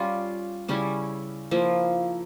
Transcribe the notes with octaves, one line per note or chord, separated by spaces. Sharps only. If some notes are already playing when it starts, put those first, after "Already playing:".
Already playing: G3 C#4 F4
C#3 G3 C#4 E4
F3 A#3 E4